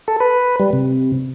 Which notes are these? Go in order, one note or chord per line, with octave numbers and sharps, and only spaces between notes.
A4
B4
G3
C3